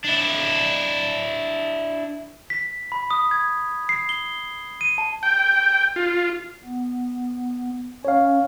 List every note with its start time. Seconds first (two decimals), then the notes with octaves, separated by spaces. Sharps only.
0.04 D4 E4
2.50 B6
2.92 B5
3.11 D#6
3.31 G#6
3.89 C7
4.09 G7
4.81 D#7
4.98 A5
5.23 G5
5.96 F4
6.65 B3
8.05 C#4 C#5 F5